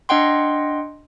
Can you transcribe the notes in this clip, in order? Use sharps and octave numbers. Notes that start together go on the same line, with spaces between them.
D4 D#5 F#5 G5 C6